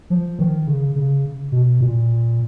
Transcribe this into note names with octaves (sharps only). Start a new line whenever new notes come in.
F3
D#3
C#3
C#3
B2
A#2